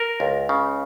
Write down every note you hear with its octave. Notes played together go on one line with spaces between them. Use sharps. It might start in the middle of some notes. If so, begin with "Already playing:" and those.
Already playing: A#4
C#2
C#3